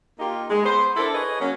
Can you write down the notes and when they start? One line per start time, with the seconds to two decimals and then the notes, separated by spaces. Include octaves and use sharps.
0.19 A#3 D#4 F4 G4
0.49 G#3
0.64 B3 G#4 C5
0.96 D4 E4 A4 A#4 C5
1.14 G#4 B4 C#5 D#5
1.40 F#3 A#3 C#4